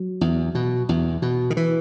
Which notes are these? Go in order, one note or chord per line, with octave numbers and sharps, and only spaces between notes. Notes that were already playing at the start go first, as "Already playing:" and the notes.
Already playing: F#3
E2
B2
E2
B2
D#3
E3